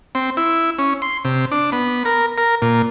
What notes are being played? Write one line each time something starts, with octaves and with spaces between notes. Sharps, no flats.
C4
E4
C#4
C6
C3
D4
B3
A#4
A#4
A#2